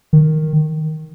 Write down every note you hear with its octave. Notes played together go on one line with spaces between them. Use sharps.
D#3